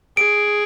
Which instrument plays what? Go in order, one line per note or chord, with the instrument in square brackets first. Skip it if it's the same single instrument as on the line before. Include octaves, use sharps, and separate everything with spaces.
[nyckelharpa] G#4 [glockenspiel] D7